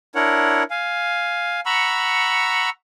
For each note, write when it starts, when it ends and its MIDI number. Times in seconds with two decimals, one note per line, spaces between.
0.15 0.63 62
0.15 0.63 64
0.15 0.63 70
0.15 0.63 73
0.15 0.63 78
0.71 1.60 77
0.71 1.60 80
1.66 2.70 78
1.66 2.70 82
1.66 2.70 83
1.66 2.70 85
1.66 2.70 88